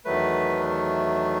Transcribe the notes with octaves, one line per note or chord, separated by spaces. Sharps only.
E2 D#3 F#3 A3 B4